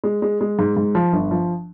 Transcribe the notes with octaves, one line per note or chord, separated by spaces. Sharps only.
G#3
G#3
G#3
G#2
G#2
F3
G1
F3